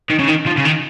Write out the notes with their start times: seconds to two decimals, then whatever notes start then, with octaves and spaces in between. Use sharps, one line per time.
0.10 D#3
0.19 C#3
0.28 D#3
0.46 F3
0.58 C#3
0.65 D#3